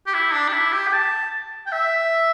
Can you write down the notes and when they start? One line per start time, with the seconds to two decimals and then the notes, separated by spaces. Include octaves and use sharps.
0.07 G4
0.14 E4
0.34 D4
0.48 G4
0.53 E4
0.73 G4
0.87 G5
0.93 A5
1.67 G5
1.72 E5